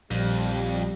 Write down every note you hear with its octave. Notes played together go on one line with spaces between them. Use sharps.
A#1 F2 G3